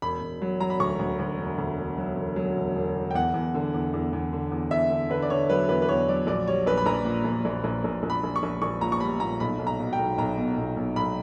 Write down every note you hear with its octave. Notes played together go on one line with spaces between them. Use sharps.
E1 B5
E1
F#3
F#3 A#5
B5
D2 C#6
D2
D2
E1
D2
E1
F#3
E1
F#3
E1
E1
E1
G5
E2 F#5
E2
D3
E2
E2
E2
D3
E2
E2 E5
D3
D3 B4
D5
D3 C#5
F#3 B4
E2 B4
B4
E2 C#5
F#3 D5
A#1 D5
G3 C#5
A#1 B4
B5
A#1 A#5
A#2
A#1
A#1
A#1
A#1
A#1
B5
A#1
C#6
A#1
A#1 C#6
A#2 A#5
C#6
G3 B5
A#2 A#5
B1 B5
B1
A#5
B2
G5
B1
B1 A#5
B2
B1
B1
B1 B5